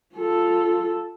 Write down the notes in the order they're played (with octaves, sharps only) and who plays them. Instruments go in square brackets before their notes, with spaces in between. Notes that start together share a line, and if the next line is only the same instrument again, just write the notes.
[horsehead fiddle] F4 A4